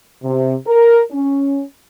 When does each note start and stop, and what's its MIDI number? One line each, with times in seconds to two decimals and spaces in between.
0.23 0.54 48
0.67 1.01 70
1.11 1.62 61